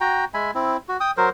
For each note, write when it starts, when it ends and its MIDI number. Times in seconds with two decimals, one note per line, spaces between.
0.01 0.25 66
0.01 0.25 79
0.01 0.25 82
0.34 0.51 56
0.34 0.51 76
0.34 0.51 80
0.34 0.51 83
0.55 0.77 60
0.55 0.77 64
0.88 0.97 66
1.00 1.11 79
1.00 1.11 87
1.17 1.29 54
1.17 1.29 70
1.17 1.29 72